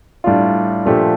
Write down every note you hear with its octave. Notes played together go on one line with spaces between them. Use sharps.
A2 G3 D4 F4
A#2 F3 A3 D4 G4